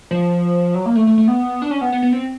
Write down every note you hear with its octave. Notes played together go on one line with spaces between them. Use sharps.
F3
F#3
A#3
A3
A3
A3
B3
D4
C#4
B3
B3
B3
C4